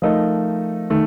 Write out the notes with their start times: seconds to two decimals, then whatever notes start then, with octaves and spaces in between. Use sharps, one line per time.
0.02 F3 A3 D#4 A#4 D#5
0.90 D#3 A3